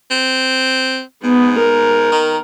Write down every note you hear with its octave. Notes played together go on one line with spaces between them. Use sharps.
C4
G#2 B3
A#4
D#3